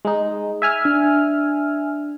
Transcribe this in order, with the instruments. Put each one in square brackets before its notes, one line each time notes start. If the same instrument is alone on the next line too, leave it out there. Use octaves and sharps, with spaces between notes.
[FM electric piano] G#3 D#4
E5 G#5 F6
[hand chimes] D4